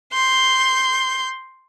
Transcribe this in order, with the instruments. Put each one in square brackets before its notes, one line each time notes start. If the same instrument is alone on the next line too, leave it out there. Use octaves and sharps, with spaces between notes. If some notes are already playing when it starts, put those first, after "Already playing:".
[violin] C6 G6